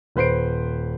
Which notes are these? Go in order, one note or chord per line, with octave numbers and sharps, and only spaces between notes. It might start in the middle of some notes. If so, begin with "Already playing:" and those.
D#1 B4 C5 C7 D7